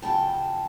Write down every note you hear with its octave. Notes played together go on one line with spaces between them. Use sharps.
F2 C#3 F#3 G5 A5